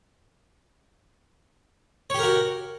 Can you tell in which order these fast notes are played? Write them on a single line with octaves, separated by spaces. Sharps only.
C#5 G4 A#4 F#4